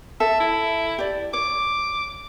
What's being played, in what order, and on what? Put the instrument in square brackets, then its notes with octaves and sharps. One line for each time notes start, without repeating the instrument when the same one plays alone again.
[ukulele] A4 [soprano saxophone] E5
[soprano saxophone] E4
[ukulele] G4 D5
[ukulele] C#5 [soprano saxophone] D6